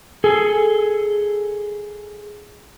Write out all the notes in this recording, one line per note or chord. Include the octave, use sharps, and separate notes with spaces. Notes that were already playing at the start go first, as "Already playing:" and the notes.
G#4 A4